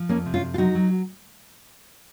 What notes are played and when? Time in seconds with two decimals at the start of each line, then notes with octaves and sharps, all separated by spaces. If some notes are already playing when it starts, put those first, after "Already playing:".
Already playing: F3
0.09 F2 A#3 C#4
0.26 C3
0.34 C#4 F4
0.42 F2
0.54 F4
0.58 F#3 D#4 F#4
0.75 F#3